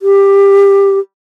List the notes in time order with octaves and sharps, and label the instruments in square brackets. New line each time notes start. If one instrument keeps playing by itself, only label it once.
[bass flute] G4